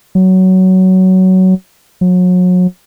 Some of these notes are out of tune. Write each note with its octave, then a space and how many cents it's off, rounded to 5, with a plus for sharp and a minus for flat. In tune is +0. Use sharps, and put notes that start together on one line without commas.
F#3 +15
F#3 -35